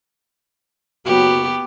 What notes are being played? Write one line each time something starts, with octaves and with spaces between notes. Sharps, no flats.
F#1 F#3 B3 F#4 G4